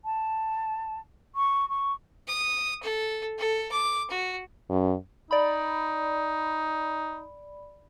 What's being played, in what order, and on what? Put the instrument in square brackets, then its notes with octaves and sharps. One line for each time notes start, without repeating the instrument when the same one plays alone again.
[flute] A5
C#6
C#6
[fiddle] D#6
A4
A4
D6
F#4
[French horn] F#2
[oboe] D#4 [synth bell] D5 B5